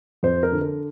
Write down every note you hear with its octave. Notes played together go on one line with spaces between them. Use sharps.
F2 C5
A#4
D3
A#4